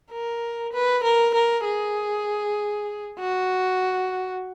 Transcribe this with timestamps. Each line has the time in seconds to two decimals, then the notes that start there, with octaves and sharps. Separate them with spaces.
0.12 A#4
0.73 B4
1.04 A#4
1.35 A#4
1.65 G#4
3.19 F#4